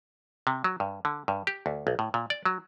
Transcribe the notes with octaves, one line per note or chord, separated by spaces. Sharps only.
C3
F#3
G2
D3
G2
G4
D2
B1
A2
A#2
D5
F#3